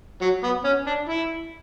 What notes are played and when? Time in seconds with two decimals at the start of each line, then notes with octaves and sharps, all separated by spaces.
0.21 F#3
0.43 B3
0.64 C#4
0.86 D4
1.09 E4